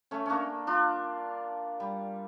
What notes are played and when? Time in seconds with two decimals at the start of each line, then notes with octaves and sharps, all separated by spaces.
0.11 A3 C#4
0.26 A#3 C#4 D4
0.67 D4 F4
1.80 G3